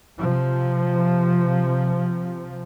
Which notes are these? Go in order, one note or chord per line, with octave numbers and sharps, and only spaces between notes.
C3 F3